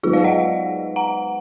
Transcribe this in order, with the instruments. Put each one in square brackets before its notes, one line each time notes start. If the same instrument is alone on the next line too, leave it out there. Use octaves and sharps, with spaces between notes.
[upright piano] G#2 F#3 B3 [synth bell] F4 G#4
[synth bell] D5 F5
D#5 F#5
F#5 A#5